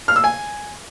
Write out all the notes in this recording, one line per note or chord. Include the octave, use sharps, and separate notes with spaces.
F6
E6
G#5